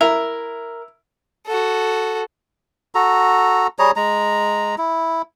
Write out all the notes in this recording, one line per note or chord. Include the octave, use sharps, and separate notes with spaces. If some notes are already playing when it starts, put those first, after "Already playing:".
E4 A#4
F#4 A4
F#4 A4 A#5
G3 G#4 C#5 A#5
G#3 A#5
E4